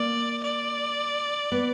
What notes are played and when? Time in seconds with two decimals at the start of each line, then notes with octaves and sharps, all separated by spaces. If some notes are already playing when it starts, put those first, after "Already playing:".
Already playing: A#3 D5
0.43 D5
1.52 B3